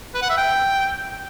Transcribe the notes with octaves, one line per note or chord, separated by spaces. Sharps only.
B4
F#5
E5
G5